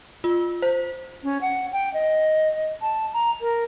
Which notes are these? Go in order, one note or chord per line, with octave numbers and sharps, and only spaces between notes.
F4
C5
C#4
F#5
G5
D#5
A5
A#5
A#4